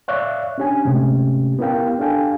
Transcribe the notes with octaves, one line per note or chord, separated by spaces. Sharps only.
C#5 D5 E5 F5 C#6 F#6
C#4 D4 G4 C#5 G#5
G#2 C3 A3 C#4 G4
B3 E4 G4 A#4 F5 G5
D4 G4 A4 F5 G5 G#5